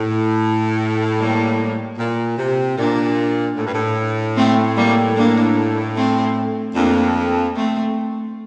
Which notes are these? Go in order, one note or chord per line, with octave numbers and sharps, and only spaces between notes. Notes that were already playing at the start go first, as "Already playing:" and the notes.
Already playing: A2
G3 A#3
A#2
C3
A#2 A#3 D4
A2
G2
A2
A3 C4
G3 A#3
A#3 D4
A3 C4
F2 A#3 D4
A3 C4